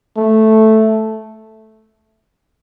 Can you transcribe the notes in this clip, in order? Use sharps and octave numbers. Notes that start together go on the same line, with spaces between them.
A3